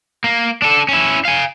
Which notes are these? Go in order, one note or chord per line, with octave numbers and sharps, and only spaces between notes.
A#3
D4 A4
C#4 E4
F5 G#5